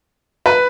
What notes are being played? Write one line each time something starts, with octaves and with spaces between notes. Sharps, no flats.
B4